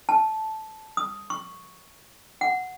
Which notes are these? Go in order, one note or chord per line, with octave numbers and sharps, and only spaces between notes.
A5
D#6
C#6
F#5